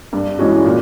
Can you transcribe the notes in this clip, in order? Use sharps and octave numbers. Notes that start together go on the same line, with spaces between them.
G2
E3 G#3 C#4 F#4
A#2